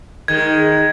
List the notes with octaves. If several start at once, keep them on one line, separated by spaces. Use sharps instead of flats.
D#3 G#3 G#6